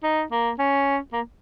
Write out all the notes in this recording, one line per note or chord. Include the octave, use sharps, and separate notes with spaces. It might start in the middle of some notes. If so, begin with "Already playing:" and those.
D#4
A#3
C#4
A#3